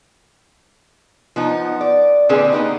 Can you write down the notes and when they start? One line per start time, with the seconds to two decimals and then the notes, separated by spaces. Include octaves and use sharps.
1.36 F3 B3 D#4
1.81 D5
2.29 A#2 D3 C4 G#4 B4 D5
2.52 A#3 B3 D#4 G4